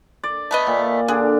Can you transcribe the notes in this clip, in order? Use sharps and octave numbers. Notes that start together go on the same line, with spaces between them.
D5
A3 B3 D#5
A#2
D3 D4 G#4